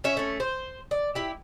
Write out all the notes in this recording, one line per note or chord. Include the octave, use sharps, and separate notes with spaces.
C#4 C#5 E5
A3 C#4
C5
D5
E4 G4